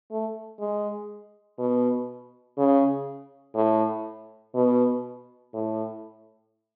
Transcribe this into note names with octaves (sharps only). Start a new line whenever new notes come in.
A3
G#3
B2
C#3
A2
B2
A2